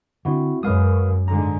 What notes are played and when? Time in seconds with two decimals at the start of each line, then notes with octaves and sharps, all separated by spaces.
0.25 D3 C4 E4 F#4
0.63 F#2 G#3 B4 F5 D#6
1.28 G#2 D3 A#5